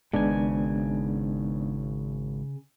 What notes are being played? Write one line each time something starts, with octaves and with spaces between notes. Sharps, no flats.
G#1 G#2 C#3 G#3 B3 D4 G#5